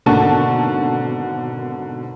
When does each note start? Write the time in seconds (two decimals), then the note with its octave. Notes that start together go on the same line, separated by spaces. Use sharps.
0.06 G#1 B2 D3 A#3 A5 C#6